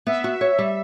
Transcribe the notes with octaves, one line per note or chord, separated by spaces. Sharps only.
B3 E5
F#4
C#5
G3